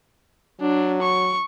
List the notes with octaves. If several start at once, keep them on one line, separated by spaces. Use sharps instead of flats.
F#3 D4
C#6